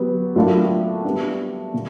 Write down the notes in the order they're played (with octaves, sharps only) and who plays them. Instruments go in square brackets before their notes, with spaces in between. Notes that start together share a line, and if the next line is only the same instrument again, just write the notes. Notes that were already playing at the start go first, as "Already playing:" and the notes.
Already playing: [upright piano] F#3 B3 G4
A2 F#3 A#3 D4 F4
G3 B3 D4
A#2